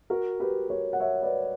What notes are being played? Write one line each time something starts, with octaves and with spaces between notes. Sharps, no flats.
F#4 A#4
G4 B4
A#4 C#5
F#5
C#5 E5
B4 D5